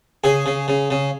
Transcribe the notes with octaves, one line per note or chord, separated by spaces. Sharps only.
C#3 G#4
C#3
C#3
C#3